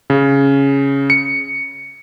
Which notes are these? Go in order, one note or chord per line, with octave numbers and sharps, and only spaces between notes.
C#3
C#7